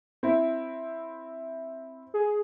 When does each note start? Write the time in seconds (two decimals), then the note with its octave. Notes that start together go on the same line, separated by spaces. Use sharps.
0.23 C4 E4
2.14 G#4